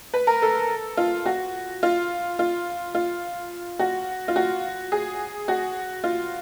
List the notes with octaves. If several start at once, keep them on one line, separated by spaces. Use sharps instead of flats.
B4
A#4
A4
F4
F#4
F4
F4
F4
F#4
F4
F#4
G#4
F#4
F4